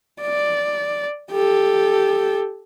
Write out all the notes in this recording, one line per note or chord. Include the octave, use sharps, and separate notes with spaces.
D5
G4 A4